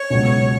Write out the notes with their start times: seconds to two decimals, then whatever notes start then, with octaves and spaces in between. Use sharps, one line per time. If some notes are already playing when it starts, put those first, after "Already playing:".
Already playing: C#5
0.10 C#2 B2 F#3